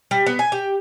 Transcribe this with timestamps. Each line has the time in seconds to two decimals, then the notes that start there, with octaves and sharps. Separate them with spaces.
0.11 G3
0.26 B3
0.39 G#5
0.52 G4